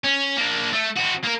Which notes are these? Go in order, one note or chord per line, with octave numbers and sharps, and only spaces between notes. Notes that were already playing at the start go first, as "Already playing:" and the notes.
C#4
A#3 D4
A3
C4 F#4
A#3 A#4